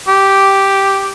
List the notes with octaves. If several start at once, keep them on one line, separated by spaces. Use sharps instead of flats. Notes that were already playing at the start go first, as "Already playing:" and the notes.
G4